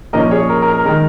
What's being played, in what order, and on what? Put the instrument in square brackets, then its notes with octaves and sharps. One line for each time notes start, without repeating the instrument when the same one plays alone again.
[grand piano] A#2 F3 A#3 C#4 A#4 D#5
G#4 C#5
A#4
A#4
A#4
D#3 G#3 A#4